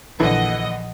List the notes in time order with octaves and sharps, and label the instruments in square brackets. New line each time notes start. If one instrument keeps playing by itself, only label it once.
[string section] A#1 D#5 F#5 [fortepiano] D3 E3